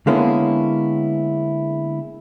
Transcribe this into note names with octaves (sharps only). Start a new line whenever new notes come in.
D3 G#3 A#3 B3 C#4 E4